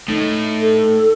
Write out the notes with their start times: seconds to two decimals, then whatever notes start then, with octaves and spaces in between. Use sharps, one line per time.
0.09 A2 A3 D#4
0.60 A4